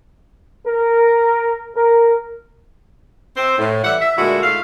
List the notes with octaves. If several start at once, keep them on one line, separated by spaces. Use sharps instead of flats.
A#4
A#4
C4 C5
A2
E3 G3 E5 F#5
E5
A#2 D3 G#3 A3 E4 F#4
G#2 A3 F4 F5